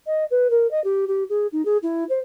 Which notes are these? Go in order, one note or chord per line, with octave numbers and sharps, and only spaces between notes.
D#5
B4
A#4
D#5
G4
G4
G#4
D#4
G#4
E4
C5